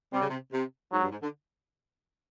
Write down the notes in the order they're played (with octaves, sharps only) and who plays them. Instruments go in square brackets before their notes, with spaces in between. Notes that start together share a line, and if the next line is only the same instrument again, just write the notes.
[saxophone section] C3 [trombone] G3
[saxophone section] C#3
C3
C3
[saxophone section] G#2 [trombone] F#3
[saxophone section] G2
G#2
D3